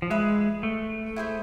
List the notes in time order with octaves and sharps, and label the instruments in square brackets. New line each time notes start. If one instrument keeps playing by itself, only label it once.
[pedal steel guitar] F3
[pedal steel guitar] G#3 [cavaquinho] B4 E5 B5
[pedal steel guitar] A3
[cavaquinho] E4 G#4 C5 E5